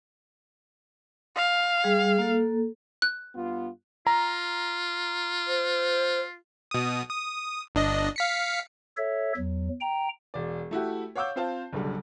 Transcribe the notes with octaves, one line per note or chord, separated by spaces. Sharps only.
F5
G3 G#4
A#3 A4
F#6
G2 B3 F4
F4 A#5
C5
B2 D#6
D#6
G1 D4 D#5
F5 B6 C#7
A4 C#5 E5
E2 F#3
G5 A#5
E1 D5
A3 E4 F#4 G4
C#5 F5 F#5 D6 E6 G6
C4 F4 C5 F5 A5
F#1 B1 D3 G3